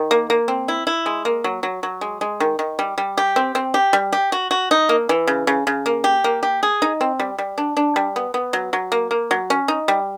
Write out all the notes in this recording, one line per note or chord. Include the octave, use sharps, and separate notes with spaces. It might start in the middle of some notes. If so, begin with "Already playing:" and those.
Already playing: D#3
A#3
A#3
C4
E4
E4
G#3
A#3
F#3
F#3
F#3
G#3
G#3
D#3
D#3
G3
G3
G4
C4
C4
G4
G3
G4
F#4
F#4
D#4
A#3
E3
C#3
C#3
C#3
A#3
G4
A#3
G4
G#4
D#4
C4
G3
G3
D4
D4
G3
B3
B3
F#3
F#3
A#3
A#3
F#3
C#4
D#4
G3